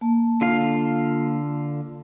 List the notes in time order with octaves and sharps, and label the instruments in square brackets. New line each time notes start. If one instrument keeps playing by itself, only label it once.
[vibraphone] A#3 A5
[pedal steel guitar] D3 F4 F5